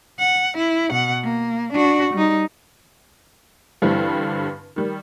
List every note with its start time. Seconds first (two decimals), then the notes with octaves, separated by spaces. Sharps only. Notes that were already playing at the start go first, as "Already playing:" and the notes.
0.19 F#5
0.57 E4
0.91 B2 F#5
1.24 A#3
1.73 D4 F#4
2.14 G3 D#4
3.82 G2 D3 E3 G3 C4
4.76 D#3 G3